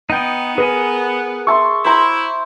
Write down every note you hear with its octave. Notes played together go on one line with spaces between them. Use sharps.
B3 D#4 G5
G#4 A#4 B4 G#5
E5 A5 C6 C#6
E4 C5 A#5 C6